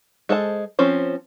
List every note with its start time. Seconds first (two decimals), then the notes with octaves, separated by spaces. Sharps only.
0.29 G#3 A4 C5 A5
0.79 F3 C4 C#4 C5